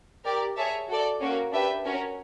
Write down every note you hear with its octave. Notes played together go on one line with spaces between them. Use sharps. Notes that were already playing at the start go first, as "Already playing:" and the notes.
G4 A#4 D5
G#4 C#5 E5 A5
F#4 A4 D5
A#3 C#4 F#4 A#4
D4 G4 B4 E5 G5
C#4 F#4 A#4